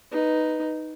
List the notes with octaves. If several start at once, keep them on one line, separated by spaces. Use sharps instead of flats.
D#4 B4